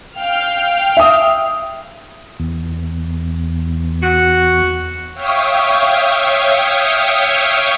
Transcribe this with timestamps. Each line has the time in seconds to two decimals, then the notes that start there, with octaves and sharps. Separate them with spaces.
0.18 F5 G5 F6
0.97 E5 D#6
2.40 E2
4.03 F#4
5.14 C#5 E5 F5 G5 C#6 D#6